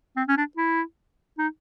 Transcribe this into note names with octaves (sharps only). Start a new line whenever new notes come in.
C4
C#4
D4
E4
D#4